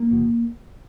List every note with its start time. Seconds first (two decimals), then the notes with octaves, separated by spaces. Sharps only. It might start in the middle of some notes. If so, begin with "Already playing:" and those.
Already playing: A#3
0.11 F1 E2 B2